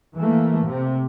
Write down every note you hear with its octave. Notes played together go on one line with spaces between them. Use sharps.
E3 A3 A#3
C3